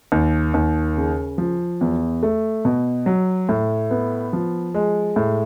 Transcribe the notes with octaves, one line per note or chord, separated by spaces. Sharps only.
D#2
D#2
C#3
F3
E2
A3
B2
F#3
A2
B3
F3
G#3
A2